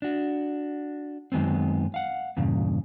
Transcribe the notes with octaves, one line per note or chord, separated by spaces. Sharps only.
D4 F#4
F#2 D#3 G#3 B3 C4
F5 F#5
E2 G2 A#2 C#3